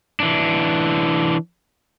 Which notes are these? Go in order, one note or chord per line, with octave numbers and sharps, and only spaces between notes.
E3 D4